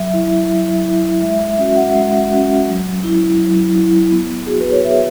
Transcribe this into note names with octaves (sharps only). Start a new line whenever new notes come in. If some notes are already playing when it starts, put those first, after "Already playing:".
Already playing: F#3 E5
E4
F#3
E4
G#3 E5
E5
C#4 F#4 E5
F#5
G#3
C#4 F#4
F#3
E4
F#3
E4
B3
F#4 G#4
B4
C#5
B3 E5